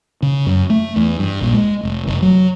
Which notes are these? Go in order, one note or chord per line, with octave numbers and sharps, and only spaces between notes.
C#3
F#2
A3
E2
G2
A#1
G#3
F1
F1
F#3